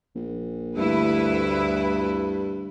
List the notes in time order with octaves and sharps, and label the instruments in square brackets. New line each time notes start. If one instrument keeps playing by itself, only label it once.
[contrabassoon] A#1
[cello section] D2 E4 B4 [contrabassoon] G2